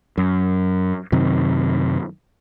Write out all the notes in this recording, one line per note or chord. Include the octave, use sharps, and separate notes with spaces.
F#2
F#2 C3 D#3